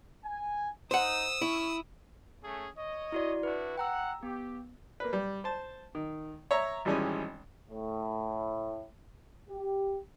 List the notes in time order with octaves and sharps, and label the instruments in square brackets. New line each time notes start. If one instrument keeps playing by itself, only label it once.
[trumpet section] G#5
[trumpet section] D#4 [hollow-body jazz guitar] C5 F#5 [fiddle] D#6 E6
[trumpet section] C#4 C#6 [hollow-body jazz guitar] E4
[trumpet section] A3 C#4 G#4
C#5 D#5
[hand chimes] E4 F#4 D5
[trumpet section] D4 E4 F#4 [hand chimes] B4
[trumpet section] F#5 [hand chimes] G5 A#5 E6
[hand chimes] B3 [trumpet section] G4
[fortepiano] A#3 B4
G3
C5 A5
D#3
C#5 E5 A#5
G#1 E3 G3 G#3 C#4 G#5
[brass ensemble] A2
G4